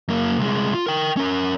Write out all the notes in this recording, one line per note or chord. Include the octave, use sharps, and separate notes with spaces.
F#2 A#3
C2 G#3
F4
A#4 G5
C#4 A#4